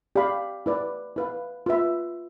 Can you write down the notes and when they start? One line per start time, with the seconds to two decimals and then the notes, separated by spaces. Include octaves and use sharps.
0.16 G4 D5 F5 B5
0.66 E4 B4 D5
1.16 E4 B4 F5
1.66 F4 B4 E5